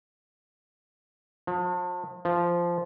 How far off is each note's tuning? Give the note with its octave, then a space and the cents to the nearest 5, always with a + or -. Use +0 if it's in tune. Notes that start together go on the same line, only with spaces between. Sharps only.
F3 +40
F3 -10